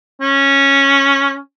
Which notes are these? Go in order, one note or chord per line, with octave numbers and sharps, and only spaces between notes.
C#4